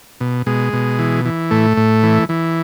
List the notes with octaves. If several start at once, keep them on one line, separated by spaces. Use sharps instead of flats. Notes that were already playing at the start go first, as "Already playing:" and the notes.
B2
B2 G#3
B2
E3
E3
A2 A3
A2
E3
E3